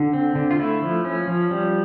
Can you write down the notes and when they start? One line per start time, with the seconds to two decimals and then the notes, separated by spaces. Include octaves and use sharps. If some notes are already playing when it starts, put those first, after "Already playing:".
Already playing: D3
0.13 C4
0.35 D3
0.51 F4
0.59 A3 E4
0.82 F3
1.05 C#4
1.28 F3
1.51 G3